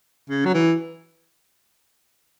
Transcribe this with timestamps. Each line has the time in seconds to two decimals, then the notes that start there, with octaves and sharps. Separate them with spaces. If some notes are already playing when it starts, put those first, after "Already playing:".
0.30 C#3
0.45 F#3
0.54 E3